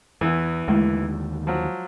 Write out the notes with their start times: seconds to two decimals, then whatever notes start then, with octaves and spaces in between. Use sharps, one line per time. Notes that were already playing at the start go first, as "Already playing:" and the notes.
0.21 E2 E3 B3
0.68 D#2 D3 D#3 G#3 A3 E4
1.47 F3 F#3